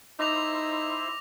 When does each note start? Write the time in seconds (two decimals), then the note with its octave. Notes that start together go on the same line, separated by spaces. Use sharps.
0.19 D#4 E4 C5 D6 A#6 F7